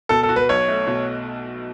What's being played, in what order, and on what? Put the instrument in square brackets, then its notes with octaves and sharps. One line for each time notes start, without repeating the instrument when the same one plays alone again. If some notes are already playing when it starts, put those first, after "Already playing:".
[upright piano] B2 [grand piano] A4
[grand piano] A4
[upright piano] F#4
[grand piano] B4
[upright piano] B1 [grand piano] C#5
[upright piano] A3
B2